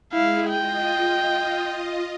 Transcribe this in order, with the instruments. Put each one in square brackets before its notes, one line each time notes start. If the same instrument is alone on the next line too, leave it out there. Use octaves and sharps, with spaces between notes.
[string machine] G#3 G#4 [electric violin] E4 F5
[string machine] F4 D#5 [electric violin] G5